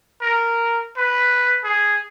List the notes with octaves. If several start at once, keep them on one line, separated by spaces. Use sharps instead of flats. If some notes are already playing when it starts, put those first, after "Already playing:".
A#4
B4
G#4